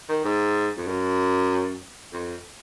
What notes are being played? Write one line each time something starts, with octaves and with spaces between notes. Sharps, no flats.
D#3
G#2
F2
F#2
F2